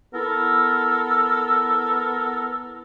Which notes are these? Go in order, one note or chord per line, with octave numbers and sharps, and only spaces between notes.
B3 E4 A4 A#4 E6